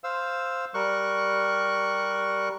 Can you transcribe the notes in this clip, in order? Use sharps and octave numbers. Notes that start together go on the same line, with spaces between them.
C5 F5 E6
G3 A#4 C#6 F#6